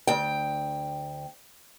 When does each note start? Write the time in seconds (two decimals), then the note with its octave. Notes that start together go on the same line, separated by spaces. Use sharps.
0.07 D2 G5